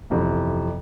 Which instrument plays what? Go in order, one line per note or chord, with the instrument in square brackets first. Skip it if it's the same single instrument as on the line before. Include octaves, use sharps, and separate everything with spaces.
[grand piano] G1 F2 C3 E3